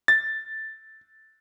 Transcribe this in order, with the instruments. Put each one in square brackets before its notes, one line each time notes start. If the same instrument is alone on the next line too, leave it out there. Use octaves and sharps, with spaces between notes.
[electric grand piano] A6